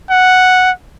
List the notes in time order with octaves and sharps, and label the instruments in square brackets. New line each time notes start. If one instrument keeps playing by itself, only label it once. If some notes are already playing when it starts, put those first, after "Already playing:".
[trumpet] F#5